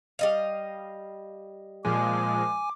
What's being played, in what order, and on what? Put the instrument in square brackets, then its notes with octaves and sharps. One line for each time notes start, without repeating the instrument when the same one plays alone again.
[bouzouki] G3 D#5 F5
[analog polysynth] A#2 F3 G#3 [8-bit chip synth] G#5 [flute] D6